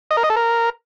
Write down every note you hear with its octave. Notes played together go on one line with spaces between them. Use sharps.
D#5
A#4
D#5
A4
A#4